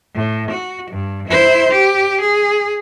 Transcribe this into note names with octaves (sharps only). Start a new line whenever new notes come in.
A2
F#4
G2
E4 C5
G4
G#4